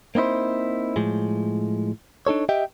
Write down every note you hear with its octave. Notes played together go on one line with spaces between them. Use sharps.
A#3 C4 D#4 E4 C5
A2 F3 G#3
D4 D#4 A4 C#5
G4 D#5 E5 G5